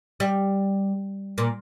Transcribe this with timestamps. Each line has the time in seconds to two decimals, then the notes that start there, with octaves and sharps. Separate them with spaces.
0.20 G3
1.38 A#2